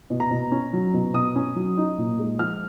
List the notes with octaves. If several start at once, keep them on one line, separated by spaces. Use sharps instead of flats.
B2
A#5
B2
C#4
F#3
B2
B2 D#6
C#4
F#3
D#4
A#2
G#3
F3 F6